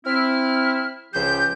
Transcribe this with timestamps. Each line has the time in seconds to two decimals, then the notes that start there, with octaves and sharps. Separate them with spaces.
0.05 C4 E4 F6
1.14 C#2 F3 G4 G6